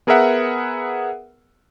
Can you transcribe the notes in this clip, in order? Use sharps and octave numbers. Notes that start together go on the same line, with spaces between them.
B3 G#4 A#4 B4 E5 F#5